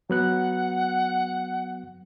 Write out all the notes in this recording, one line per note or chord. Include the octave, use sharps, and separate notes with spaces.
F#3 B3 F#5 F#6